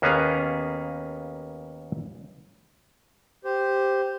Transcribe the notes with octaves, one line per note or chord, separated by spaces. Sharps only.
D#2 A#3 B3 C#4 G#4 F5
G4 C5